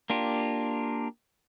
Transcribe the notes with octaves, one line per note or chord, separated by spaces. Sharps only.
A#3 D4 F4 G4